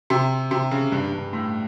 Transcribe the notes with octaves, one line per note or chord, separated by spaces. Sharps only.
C3
C3
C#3
G2
G2
A2